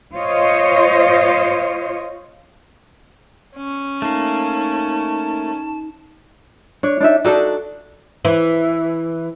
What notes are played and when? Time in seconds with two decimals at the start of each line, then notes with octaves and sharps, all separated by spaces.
0.14 F4 C5 C#5 D#5
3.56 C#4
4.02 A3 A#3 D#4 A5
6.83 D4 C#5
7.00 D4 D#4 E5
7.25 D4 D#4 F#4 A4
8.25 E3